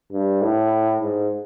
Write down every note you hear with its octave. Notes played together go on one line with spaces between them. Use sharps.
G2
A2
G#2